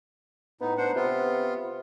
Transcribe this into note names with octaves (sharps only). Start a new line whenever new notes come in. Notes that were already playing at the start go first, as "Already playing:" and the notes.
A2 B3 D#4
D4 C5 F#5
C3 B3 F4